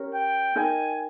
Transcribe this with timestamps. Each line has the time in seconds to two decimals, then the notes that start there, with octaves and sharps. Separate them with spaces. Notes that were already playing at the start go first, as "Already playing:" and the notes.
Already playing: C#4 G4 A#4 C#5
0.14 G5
0.56 D#4 A#4 D#5 G5 G#5